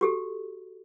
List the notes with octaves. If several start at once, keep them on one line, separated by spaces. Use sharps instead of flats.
F#4 G4 A4